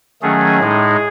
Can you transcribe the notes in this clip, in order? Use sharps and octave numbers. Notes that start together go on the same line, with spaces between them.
D#3 F#3 A3 C#4 G#4
A2 G#3 D#4